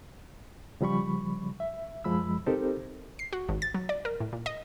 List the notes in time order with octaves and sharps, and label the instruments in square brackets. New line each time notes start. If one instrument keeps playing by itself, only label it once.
[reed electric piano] C#3 F3 G3 B5 C#6
E5
F#2 F3 G#3 B5 E6
C4 D#4 G4 A4 A#4 C5
[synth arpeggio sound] C7
F#4
G#1
A6
F#3
D5
A#4
A2
A#2
D#5